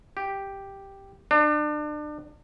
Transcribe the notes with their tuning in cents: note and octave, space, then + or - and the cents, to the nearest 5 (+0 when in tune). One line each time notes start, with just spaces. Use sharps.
G4 +0
D4 +30